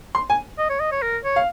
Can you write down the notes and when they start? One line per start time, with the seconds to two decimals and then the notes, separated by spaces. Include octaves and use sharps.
0.15 C6
0.30 G#5
0.58 D#5
0.70 C#5
0.80 D#5
0.92 C#5
1.02 A#4
1.24 C#5
1.36 F5